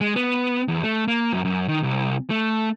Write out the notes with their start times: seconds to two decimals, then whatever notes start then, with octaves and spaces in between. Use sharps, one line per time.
0.01 G#3
0.16 B3
0.68 E2
0.84 A3
1.08 A#3
1.33 F#2
1.45 F#2
1.68 D#3
1.83 C2
2.30 A3